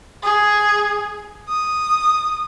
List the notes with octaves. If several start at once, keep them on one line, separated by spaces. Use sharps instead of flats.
G#4
D#6